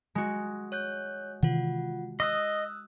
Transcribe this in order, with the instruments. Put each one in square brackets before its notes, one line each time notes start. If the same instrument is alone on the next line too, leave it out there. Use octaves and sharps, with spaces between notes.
[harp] G#3 F#4
[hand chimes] C#5 F#6 G6
[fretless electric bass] C3 D#3 E3 [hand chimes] F4 F#5
[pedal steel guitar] D#5 [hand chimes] D#6 E6 F#6